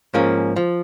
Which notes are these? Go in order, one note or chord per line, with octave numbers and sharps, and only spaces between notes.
G#2 F3 A#3 C#4
F3